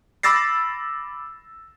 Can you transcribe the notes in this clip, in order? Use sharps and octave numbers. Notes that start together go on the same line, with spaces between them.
B5 D6 E6 A6 A#6 C7